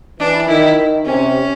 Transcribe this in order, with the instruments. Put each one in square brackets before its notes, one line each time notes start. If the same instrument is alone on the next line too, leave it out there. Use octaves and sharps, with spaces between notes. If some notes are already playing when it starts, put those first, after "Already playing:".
[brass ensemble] E3 [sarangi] D4
[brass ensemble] D#3 [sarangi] E4
[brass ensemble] D#3
[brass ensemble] C3 [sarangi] C#4